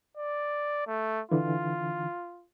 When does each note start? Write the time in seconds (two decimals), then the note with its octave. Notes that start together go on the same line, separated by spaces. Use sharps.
0.17 D5
0.87 A3
1.31 D3 E3 F4